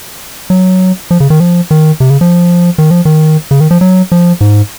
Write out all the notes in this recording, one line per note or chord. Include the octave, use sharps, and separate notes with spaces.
F#3
F3
C#3
D#3
F3
D#3
C3
C#3
F3
D#3
F3
D#3
C#3
D#3
F3
F#3
F3
G#2